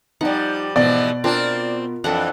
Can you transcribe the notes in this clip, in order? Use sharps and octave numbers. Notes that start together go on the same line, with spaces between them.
F3 G3 D#4 F#5
G#2 B2 E3 F3 D5
C4 D4 F4 A#4
F2 E3 D4 A4 F#5